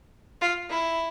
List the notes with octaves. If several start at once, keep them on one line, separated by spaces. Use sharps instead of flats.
F4
E4